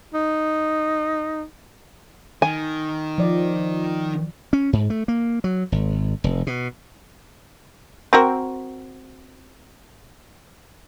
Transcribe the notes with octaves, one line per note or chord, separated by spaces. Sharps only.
D#4
D#3 G#5
F3 D5
C#4
G#2
A3
A#3
F#3
G#1
F1
B2
C4 F#4 A#4